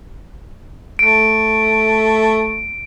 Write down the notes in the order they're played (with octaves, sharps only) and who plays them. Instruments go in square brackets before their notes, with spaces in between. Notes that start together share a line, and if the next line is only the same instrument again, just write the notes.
[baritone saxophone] A3 [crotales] D7